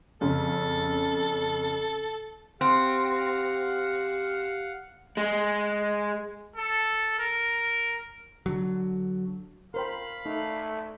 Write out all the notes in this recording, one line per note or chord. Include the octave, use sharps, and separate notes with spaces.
F2 C#3 A4
C4 G4 F5 F#5 F6
G#3
A4
A#4
D3 F#3
A#4 C5 F5 G5 B5
A3 D#4